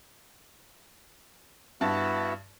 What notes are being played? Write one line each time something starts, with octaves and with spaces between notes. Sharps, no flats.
G2 B3 E4 F#4 A5